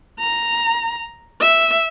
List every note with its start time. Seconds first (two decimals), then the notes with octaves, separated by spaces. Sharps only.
0.20 A#5
1.41 E5